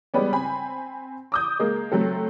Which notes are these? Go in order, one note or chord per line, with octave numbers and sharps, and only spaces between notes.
G3 G#3 B3 C#4
C4 G#5 B5
D6 D#6 G6
G#3 A#3
F#3 A3 C4 A4